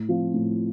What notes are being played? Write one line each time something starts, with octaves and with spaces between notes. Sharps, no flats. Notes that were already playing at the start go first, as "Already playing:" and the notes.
Already playing: A2
F3 C4 F4
A2